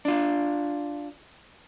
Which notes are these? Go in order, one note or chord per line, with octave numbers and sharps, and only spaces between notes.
D4 F4